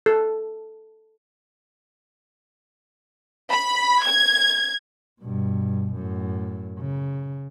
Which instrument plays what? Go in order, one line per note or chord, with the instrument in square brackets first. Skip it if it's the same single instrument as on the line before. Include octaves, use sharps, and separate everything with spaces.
[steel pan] A4
[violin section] B5
G#6
[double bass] G2 B2
F#2 A2
C#3